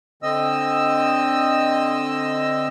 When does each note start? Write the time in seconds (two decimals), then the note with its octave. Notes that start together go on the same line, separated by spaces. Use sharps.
0.23 D3 C4 D#5 E6